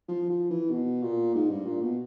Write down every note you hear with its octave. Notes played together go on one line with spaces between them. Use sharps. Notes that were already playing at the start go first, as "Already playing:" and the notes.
F3
F3
E3
B2
A#2
G#2
G2
A#2
B2